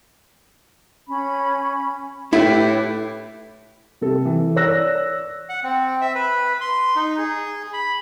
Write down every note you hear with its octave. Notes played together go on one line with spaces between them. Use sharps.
C#4 B5
A2 E4 G4 B4
C3 A4
E3
C#5 D5 E6 F#6 A#6
F#5
C4
E5
B4
C6
D#4
G#4
B5